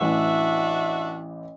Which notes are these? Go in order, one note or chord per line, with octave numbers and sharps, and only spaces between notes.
A1 E3 D4 F#4 E5